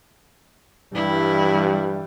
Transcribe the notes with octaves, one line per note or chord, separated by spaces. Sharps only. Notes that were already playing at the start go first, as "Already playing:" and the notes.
G2 E3 G3 E4